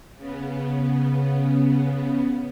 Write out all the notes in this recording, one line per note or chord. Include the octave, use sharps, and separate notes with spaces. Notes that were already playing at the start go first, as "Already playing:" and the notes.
C#3 B3